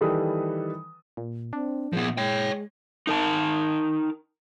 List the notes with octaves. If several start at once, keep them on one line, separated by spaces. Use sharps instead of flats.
D#3 E3 G3 A4 B4 D#6
A#2
C4 D4
A#2 F3 B3 G#4
G#3 C#5 G5
D#4 A#4 A5